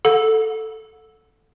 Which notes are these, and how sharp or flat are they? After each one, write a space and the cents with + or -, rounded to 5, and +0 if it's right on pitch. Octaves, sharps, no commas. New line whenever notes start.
A4 +0 F#5 -30